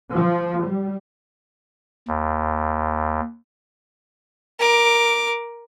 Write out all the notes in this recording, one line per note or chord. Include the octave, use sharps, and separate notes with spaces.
F3
G3
D#2
A#4 D6